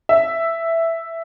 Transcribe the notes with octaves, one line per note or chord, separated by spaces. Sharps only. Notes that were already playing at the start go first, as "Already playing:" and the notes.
E5